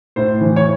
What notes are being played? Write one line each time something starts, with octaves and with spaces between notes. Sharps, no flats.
A2 C5
E3
C#5